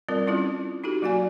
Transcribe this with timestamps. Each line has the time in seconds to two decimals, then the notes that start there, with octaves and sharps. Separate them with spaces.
0.08 G3 C4 F4 A#4 D5
0.26 G3 C#4 E4 F4 A4
0.84 D#4 F#4 G4 A4
1.02 F#3 A#3 F#4 D5 G#5